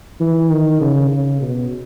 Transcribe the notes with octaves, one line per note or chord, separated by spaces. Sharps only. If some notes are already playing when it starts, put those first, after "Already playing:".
E3
D#3
C#3
C#3
B2